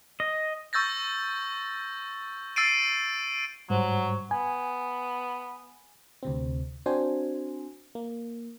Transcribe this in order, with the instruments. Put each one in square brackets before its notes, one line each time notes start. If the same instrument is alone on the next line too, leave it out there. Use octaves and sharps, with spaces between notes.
[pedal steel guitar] D#5
[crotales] C#6 E6 G6 A6 A#6
E6 A6 C7 D7 D#7
[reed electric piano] G#2 G3 C5 [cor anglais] F#3
[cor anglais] B3 [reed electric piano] G#5
[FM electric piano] D2 C3 C4
C4 D4 F#4 C5 G#5
A#3